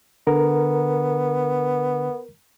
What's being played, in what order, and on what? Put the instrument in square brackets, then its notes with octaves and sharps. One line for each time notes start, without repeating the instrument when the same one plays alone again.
[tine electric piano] D3 [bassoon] B3 [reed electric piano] A#4